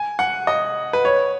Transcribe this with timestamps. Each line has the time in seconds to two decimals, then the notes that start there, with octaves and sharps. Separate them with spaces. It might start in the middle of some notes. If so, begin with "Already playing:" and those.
Already playing: G#5
0.19 F#5
0.47 D#5
0.93 B4
1.05 C#5